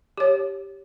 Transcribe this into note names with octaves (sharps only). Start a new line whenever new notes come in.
G4 C#5